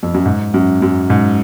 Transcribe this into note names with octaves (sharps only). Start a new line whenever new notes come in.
F2
F#2
G#2
F#2
F#2
G#2